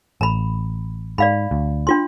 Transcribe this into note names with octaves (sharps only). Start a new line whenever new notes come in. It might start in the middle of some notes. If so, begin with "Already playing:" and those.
A1 A#5 B5
G#2 D5 F5 B5
D2
D4 F4 C6